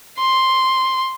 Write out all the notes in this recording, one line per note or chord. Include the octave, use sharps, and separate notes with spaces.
C6